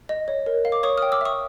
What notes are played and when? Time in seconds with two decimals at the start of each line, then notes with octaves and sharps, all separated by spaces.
0.09 D#5
0.28 C#5
0.46 A#4
0.65 F5
0.72 D6
0.83 C#5 C#6 D#6
0.97 G5 D#6 F6
1.12 D6 E6
1.21 E5 C#6 D#6